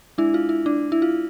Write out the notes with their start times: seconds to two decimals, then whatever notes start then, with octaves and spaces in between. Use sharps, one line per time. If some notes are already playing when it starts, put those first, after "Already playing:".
0.18 G#3 D4 E4
0.34 F4
0.49 E4
0.66 D4
0.92 E4
1.02 F4